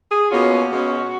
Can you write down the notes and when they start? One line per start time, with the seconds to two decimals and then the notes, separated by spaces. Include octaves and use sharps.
0.10 G#4
0.31 B2 A#3 C#4 F4 F#4
0.70 B2 G#3 C#4